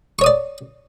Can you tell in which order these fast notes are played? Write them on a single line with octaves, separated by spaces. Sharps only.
C#6 C#5 D#6 D5